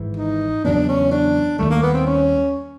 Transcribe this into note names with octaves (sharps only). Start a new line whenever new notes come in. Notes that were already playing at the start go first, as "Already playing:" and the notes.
Already playing: G#1 G#2 E3
D#4
E2 C#3 F#3 B3 D4
C#4
D4
D#2 D#3 G3 A3
A#3
B3
C4
C#4